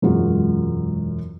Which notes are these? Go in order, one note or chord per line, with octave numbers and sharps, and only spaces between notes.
E1 F#2 G#3 F4 F#4 G#4